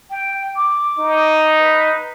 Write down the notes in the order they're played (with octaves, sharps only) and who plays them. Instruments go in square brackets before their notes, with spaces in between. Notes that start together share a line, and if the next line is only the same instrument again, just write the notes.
[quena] G5
D6
[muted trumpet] D#4
[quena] B4